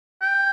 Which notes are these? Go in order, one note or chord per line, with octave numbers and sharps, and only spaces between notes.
G5